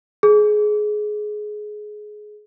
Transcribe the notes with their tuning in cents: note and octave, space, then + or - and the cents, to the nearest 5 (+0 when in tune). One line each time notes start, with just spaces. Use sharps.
G#4 +20